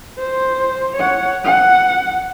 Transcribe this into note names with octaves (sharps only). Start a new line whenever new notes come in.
C5
C#5 F#5
F#5